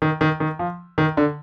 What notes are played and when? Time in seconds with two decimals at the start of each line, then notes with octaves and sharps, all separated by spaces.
0.02 D#3
0.21 D#3
0.40 D#3
0.59 F3
0.98 D#3
1.17 D3